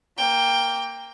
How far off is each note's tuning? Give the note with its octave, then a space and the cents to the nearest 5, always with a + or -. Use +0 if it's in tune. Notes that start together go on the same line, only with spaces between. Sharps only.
A#3 +0 G5 +15